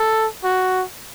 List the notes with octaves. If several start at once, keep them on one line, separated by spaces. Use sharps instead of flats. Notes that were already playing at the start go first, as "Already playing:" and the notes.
Already playing: A4
F#4